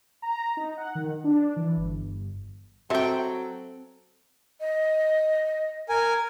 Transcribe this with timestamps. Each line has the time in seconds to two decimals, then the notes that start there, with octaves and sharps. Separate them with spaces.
0.22 A#5
0.57 D#4
0.77 F#5
0.95 D#3
1.24 D4
1.56 E3
1.76 G1
2.90 F#3 C4 F#4 A4 E5 G5
4.60 D#5
5.89 A#4 G#5